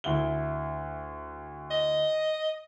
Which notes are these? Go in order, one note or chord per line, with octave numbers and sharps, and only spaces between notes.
D2 E4 G7
D#5